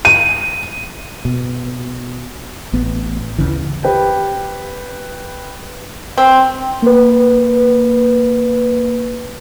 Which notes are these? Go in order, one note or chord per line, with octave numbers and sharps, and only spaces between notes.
D#7
B2
A1 B3
D2 C#3 E3
G4 B4 G5
C4
A#3 B4